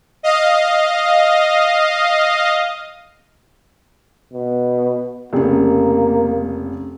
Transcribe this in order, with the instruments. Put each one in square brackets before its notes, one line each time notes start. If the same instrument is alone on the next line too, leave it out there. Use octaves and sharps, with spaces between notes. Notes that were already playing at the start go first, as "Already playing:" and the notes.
[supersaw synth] D#5 F5
[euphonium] B2
[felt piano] F1 C#3 [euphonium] A#3